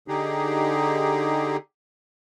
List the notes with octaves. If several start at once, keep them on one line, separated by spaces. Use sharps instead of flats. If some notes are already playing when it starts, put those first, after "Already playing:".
D3 D#4 G4 G#4